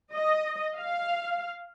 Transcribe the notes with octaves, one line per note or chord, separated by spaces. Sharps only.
D#5
F5